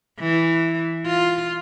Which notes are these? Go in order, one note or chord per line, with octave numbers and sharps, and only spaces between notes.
E3
F4